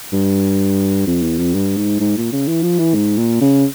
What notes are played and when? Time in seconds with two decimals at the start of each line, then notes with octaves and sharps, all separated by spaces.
0.12 G2
1.07 F2
1.22 E2
1.38 F2
1.54 G2
1.77 G#2
2.00 G#2
2.17 A#2
2.32 C#3
2.47 E3
2.63 F3
2.79 E3
2.95 G#2
3.18 A#2
3.41 C#3